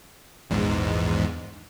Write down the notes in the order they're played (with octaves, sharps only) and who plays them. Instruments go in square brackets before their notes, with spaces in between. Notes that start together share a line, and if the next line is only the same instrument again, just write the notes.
[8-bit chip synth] A#1 E2 G#2